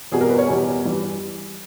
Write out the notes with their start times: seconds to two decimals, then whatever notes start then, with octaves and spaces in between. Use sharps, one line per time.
0.12 E2 B2 G3 G#4
0.21 A#4
0.30 B4
0.39 C#5
0.47 E2 B2 G3 G#5
0.83 G2 E3 G3